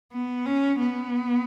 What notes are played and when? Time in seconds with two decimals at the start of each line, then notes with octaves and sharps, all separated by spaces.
0.12 B3
0.46 C#4
0.80 B3